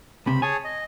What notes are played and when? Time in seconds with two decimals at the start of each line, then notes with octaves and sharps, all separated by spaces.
0.26 C#2 C3 B5
0.42 G#4 C#5 G#5 A5
0.64 D#5